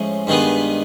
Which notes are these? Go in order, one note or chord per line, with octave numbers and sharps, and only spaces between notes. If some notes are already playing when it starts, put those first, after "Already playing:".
Already playing: A2 F3 G#3 C#4
G2 D#3 G#3 B3